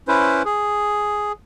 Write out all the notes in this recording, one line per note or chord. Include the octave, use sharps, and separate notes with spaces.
C#4 E4 B4 C5
G#4